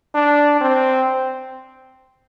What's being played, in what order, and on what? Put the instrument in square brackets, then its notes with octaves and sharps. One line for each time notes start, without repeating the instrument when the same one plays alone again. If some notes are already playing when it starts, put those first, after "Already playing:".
[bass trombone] D4
C4